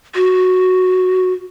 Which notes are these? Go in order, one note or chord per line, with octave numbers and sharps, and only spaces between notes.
F#4